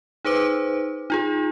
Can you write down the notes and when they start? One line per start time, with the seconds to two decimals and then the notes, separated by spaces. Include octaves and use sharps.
0.25 D#4 G#4 B4 C5 D6
1.10 D#4 F4 G#4